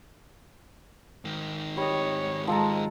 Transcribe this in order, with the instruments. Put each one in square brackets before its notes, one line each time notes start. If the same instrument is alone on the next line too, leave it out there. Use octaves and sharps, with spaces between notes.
[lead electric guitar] G#2 D#3
[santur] G3 D#5 [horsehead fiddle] C#5
[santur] F3 A4 A#5 [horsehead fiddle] G#3